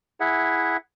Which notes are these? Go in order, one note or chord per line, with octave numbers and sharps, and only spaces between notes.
E4 G#4 E5 F#5